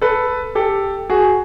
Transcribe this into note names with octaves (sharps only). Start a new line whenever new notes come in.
A4 B4
G4 A4
F#4 G#4